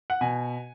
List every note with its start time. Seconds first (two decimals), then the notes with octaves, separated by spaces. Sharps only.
0.10 F#5
0.21 B2 G#5